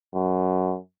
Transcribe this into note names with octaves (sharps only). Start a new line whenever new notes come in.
F#2